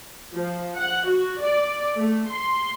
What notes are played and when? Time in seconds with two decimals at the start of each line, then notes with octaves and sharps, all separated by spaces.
0.33 F3
0.77 F#5
1.08 F#4
1.43 D5
1.97 A3
2.30 C6